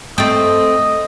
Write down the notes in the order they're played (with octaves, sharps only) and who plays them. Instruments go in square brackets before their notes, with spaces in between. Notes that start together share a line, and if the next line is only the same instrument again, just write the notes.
[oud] A3 C4 [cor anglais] D#5